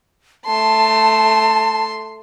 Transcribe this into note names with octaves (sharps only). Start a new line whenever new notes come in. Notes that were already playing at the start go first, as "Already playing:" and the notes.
A3 A5 C6